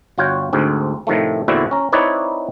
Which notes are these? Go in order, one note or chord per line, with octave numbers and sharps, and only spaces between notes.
G1 F4 F#4 C#5 G5
D2 G#2 C4
A2 C3 D#3 F3 A3
E2 A#2 D3 C4 E4 F#4
C#4 A#5
C4 D#4 E4 B4 C#5 D5